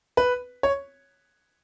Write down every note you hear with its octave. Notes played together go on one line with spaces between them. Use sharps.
B4
C#5